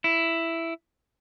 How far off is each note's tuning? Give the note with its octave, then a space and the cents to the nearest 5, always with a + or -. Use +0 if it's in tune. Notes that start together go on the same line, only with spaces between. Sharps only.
E4 +5